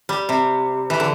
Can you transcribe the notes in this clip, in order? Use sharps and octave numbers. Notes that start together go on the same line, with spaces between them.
G3
C3
E3
D3